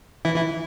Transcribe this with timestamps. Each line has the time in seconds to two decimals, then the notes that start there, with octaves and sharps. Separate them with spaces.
0.25 E3 E4
0.36 E3 E4